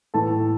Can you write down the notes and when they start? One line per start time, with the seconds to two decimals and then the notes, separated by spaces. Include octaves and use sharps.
0.14 A2 E3 A4 A5